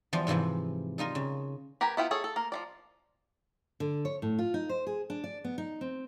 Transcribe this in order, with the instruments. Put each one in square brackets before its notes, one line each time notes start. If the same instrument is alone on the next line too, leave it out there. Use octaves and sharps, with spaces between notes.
[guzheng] E2 F3 G3 F4 C6
G#2 C3 E3 F3 E4
G3 D#4 F4 A#4
C#3
[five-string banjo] G4 A#4 B4 G5 G#5
B3 E4 F4 G5
G#4 A4 C#5
A4
A#3 A#4
F3 G#3 D5
[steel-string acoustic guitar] D3
C#5
A2
F4
D#4
C5
G#4
D4
D5
B3
D#4
C4